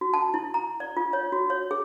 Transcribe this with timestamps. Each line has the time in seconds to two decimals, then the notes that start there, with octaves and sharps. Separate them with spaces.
0.01 F#4
0.14 A5
0.34 E4
0.54 A#5
0.80 D5
0.97 F4
1.13 C#5
1.32 F#4
1.50 C#5
1.71 G#4